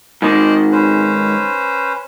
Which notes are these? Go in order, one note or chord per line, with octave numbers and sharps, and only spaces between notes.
G#2 D#3 C5 D5 D#5
C#4 B4 C5